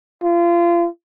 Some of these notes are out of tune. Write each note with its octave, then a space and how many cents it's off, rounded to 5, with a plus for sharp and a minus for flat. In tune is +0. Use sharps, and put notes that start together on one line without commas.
F4 -30